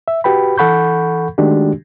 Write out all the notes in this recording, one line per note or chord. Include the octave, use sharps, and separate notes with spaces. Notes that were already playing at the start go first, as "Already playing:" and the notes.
E5
F#4 G4 B4 G5 B5
E3 A4 F#5 B5 C#6 G6
D#3 G#3 A3 D4 F#4 G4